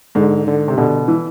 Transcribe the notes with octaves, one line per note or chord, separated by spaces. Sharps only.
G#2 D3
D3
C3
B2 D3
E3